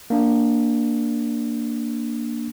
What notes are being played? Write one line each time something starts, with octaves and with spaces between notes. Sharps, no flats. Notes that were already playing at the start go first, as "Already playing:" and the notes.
A#3 D4